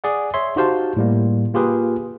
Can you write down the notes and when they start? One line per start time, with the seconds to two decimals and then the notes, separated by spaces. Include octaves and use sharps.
0.04 G#4 D5 F#5
0.34 C#5 E5 C6
0.56 D#4 F#4 G4 C5 F5 A5
0.97 A2 G3 A#3
1.54 A#3 F4 G4 G#4 B4